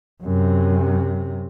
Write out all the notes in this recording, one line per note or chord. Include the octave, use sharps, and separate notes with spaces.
F#2 C3